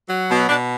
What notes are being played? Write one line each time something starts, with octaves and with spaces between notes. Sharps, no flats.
F#3
B2
B2 D4